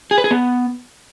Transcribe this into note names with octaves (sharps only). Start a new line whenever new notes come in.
G#4
B4
G#4
B3